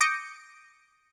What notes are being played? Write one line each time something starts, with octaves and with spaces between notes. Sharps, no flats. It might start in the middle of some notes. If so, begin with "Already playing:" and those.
D6 D#6 G6 A#6 C#7 D7